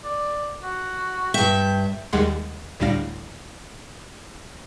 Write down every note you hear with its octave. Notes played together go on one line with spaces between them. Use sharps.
D5
F#4
G2 E5 G5
D#2 G3 G#3 F#5 C6
D2 A2 G3 D4 F5 A#6